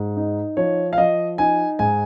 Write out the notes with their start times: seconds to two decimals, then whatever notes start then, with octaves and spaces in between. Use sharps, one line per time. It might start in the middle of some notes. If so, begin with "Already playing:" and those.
Already playing: G#2
0.17 D#4
0.57 F3 C#5
0.93 F5
0.98 F3 D#5
1.38 D#4 G#5
1.79 G#2 G#5